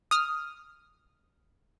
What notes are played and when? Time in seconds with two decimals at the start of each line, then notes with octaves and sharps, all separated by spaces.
0.11 D#6 F6